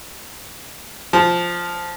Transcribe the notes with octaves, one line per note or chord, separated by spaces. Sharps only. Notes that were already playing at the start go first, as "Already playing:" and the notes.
F3